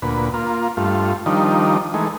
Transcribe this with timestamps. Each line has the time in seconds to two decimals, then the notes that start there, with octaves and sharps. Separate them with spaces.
0.02 D2 A#2 B4
0.34 A#3 F4
0.77 G2 A3 F4
1.26 D#3 F3 G3 D4 D#4
1.94 E3 G#3 A3 D#4